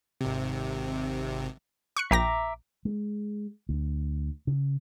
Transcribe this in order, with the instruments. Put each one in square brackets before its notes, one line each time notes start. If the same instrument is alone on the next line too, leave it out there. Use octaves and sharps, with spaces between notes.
[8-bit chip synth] G#1 C3
[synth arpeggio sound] C#6 F#6 C#7
[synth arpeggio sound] A#1 G5 A#6 [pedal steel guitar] E5 A#5 D6
[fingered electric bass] G#3
D2
C#3